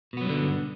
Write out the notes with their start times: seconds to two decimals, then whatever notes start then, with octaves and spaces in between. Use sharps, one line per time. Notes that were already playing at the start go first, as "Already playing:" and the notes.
0.13 B2
0.17 B3
0.21 F#3
0.25 G2
0.29 D3